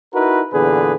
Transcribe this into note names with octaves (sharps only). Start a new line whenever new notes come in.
D#4 E4 F#4 A#4 B4
E2 A#2 D3 G#4 B4